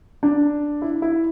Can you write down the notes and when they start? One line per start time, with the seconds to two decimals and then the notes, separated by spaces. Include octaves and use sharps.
0.23 D4
0.82 E4
1.02 E4